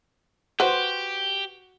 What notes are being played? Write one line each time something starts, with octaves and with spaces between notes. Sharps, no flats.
F#4 G4 B4 C5